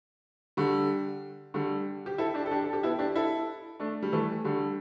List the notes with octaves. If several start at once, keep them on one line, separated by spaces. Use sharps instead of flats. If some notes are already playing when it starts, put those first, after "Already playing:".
D3 G3
D3 G3
G4
E4 A4
D4 G4
A4
D4 G4
A4
G4
B3 E4
D4 G4
E4 A4
A3 D4
G3
E3 A3
D3 G3